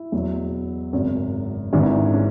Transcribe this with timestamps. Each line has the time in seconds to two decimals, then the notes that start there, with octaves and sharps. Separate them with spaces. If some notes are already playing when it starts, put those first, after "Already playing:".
Already playing: E4
0.12 E2 B2 F#3
0.93 G#1 F#2 C#3
1.73 G#1 G#2 E3 D4
2.13 C#4